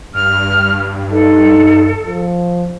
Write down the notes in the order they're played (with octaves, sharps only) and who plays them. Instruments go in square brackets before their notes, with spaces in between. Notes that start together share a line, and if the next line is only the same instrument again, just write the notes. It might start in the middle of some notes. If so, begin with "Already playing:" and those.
[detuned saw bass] G2 [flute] F6
[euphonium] D#4 [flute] A4
[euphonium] F3